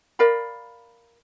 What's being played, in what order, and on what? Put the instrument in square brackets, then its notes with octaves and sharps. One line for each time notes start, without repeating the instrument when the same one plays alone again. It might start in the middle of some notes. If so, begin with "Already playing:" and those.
[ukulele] A#4 D5 F5 B5